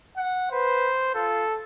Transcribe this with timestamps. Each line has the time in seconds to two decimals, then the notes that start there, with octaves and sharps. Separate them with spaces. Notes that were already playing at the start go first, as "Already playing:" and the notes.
0.17 F#5
0.52 B4 C5
1.15 F4 A4